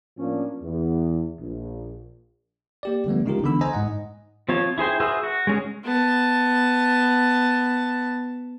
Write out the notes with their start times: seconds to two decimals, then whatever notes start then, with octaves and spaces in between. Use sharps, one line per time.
0.17 A2 F3 A#3 C#4 D4
0.61 E2
1.40 A#1
2.83 A#3 G4 D5
3.06 D3 F3 G3 A3 B3
3.26 C#3 G#3 D#4 F4 G4 A#4
3.44 D3 E3 B3 B5 E6
3.61 C5 D#5 G#5 A#5
3.73 G#2 D#5 F#5
4.49 F3 C4 F4 C#5
4.78 E4 G#4 C5 G5
5.00 F#4 G#4 B4 C5 E5
5.23 F#4
5.47 G#3 C#4 G#4
5.84 B3 A5